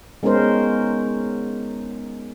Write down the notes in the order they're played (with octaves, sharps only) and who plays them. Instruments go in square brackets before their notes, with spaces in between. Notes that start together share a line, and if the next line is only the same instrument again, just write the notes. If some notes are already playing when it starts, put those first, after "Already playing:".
[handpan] G#3 B3 C#4 D#4 A#4 C5